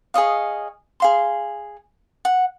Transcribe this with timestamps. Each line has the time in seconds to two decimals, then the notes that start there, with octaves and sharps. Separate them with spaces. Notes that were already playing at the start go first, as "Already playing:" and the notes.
0.14 G#4 C#5 D#5 F5
1.00 G#4 F5 C6
2.25 F#5